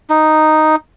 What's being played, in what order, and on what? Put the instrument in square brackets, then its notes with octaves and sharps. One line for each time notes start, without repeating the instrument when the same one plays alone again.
[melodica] D#4